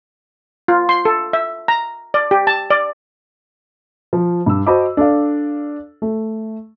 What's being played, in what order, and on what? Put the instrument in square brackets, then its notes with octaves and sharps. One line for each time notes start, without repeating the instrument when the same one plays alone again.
[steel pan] F4
C6
A4
E5
A#5
D5
G4
A5
D5
[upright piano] F3
G2 E6
F#4 C5 D#5 A5 B5 D6
D4 A4 D5 F5
A3